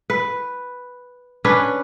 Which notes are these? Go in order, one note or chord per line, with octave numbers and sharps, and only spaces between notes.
B4
C#4 D4 B4